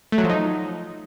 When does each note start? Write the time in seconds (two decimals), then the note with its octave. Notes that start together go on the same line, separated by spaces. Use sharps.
0.12 A3
0.18 F#3
0.24 F3
0.30 D#4